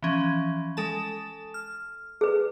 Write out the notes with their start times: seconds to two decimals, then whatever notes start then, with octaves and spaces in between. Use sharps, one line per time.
0.03 E3 F3 C#4
0.77 G#3 A4 A5
1.54 F6
2.21 G#4 B4